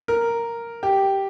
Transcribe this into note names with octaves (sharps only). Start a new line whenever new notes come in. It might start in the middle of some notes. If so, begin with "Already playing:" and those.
A#4
G4